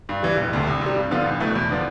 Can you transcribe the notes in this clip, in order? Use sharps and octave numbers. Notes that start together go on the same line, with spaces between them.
G2
E3 G3
E1
D2 C3
C2
C3 G3
G2
D3 F3 B3 F4
C2
B2 A3 E4 B4
E2
D3 F3 B3 D4